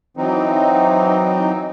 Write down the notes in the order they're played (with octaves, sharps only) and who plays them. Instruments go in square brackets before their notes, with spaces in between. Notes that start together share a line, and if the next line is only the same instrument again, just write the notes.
[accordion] E3 F#3 C4 D#4